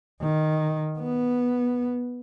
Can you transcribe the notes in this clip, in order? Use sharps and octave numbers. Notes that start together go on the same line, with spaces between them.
D#3
B3